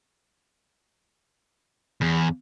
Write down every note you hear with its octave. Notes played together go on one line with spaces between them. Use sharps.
E2